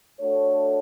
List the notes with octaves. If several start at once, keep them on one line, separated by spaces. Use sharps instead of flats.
A3 D4 F#4 A4 C#5